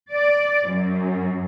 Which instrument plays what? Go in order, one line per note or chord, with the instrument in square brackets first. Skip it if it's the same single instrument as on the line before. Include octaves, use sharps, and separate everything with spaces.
[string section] D5
F#2